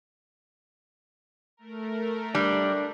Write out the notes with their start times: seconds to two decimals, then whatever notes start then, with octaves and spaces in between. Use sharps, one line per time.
1.57 A3 A#4
2.35 G3 D4